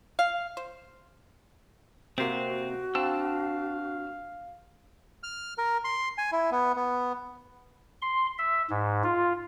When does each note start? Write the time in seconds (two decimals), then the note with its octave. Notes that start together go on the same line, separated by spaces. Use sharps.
0.19 F5
0.57 C5
2.18 C3 A#3 C4 F#4 C5
2.95 C4 D4 F5 A5 E6
5.23 F6
5.58 A#4
5.84 C6
6.18 G#5
6.32 E4
6.52 B3
6.76 B3
8.02 C6
8.38 E5
8.70 G#2
9.04 F4